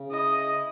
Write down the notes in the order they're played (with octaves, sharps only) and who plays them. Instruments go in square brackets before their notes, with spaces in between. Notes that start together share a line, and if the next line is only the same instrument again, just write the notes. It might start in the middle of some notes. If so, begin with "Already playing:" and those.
Already playing: [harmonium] C#3
[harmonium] E4 [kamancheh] D#5